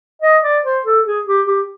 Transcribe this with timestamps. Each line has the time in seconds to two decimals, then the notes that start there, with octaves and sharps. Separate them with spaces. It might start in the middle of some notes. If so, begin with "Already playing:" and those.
0.22 D#5
0.43 D5
0.64 C5
0.85 A4
1.05 G#4
1.27 G4
1.47 G4